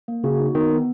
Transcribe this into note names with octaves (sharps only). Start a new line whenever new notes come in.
A#3
C#3 F#4
D#4
D#3 B3
B3